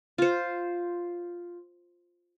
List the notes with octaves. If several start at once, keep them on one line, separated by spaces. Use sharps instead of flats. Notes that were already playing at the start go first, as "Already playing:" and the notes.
F4 C5